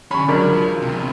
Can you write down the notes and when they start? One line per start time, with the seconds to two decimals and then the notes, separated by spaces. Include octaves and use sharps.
0.11 D3 C#4 B5 C#6
0.28 C#2 F#3 D4 A#4 B5
0.52 F3
0.82 E2 C3